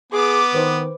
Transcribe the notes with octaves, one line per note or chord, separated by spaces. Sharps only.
B3 G#4 D6
D#3 B4 C5